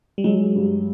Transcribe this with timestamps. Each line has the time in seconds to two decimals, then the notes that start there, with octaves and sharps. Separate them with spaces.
0.18 G3
0.24 F#3 G#3
0.55 G2